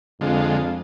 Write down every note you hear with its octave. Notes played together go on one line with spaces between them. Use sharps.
F2 D3 G#3 F4